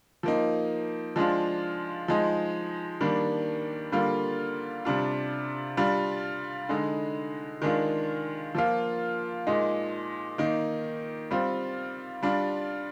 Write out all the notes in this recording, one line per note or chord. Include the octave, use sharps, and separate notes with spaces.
F3 A#3 D#4
F3 G#3 D4 F4
F3 G#3 D#4
D#3 G3 A#3 D4
D3 G3 A#3 F4
C3 G3 D4 F4
G3 D4 F4
D3 G#3 D#4
D#3 G#3 D4 F4
F3 A#3 F4
A#2 G#3 D#4
D#3 A#3 D#4
G3 C4 F4
G3 D4 F4